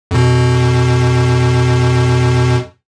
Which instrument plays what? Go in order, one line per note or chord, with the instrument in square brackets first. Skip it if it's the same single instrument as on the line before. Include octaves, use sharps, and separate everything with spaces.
[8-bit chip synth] F2 B2